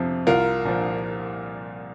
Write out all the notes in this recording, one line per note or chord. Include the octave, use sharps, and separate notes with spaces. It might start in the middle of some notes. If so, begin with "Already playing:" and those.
Already playing: F2 C3 F3
C2 F4 A#4
A#2 F3